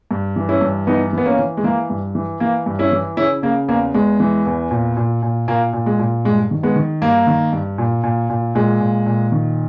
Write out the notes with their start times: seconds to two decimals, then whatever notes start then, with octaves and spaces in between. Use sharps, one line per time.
0.11 G2
0.36 E3
0.49 C#4 E4
0.61 G2
0.87 E3 B3 D#4
1.13 E3 B3
1.25 A#3 C#4
1.39 E3
1.57 G#3
1.64 E3 A#3
1.90 G2
2.15 E3
2.40 E3 A#3
2.66 G2
2.79 C#4 E4
2.92 E3
3.17 C#3 C#4 E4
3.43 C#3 A#3
3.68 E2 A#3
3.94 E2 G#3
4.20 E3
4.46 E2
4.71 A#2
4.97 A#2
5.23 A#2
5.48 A#2 A#3
5.73 A#2
5.86 G#3
5.99 A#2
6.25 G2 G#3
6.51 D#3
6.63 G#3 B3
6.76 D#3
7.02 G2 A#3
7.27 D#3
7.53 G2
7.78 A#2
8.03 A#2
8.30 A#2
8.55 A#2 G#3
8.80 A#2
9.06 A#2
9.32 D#3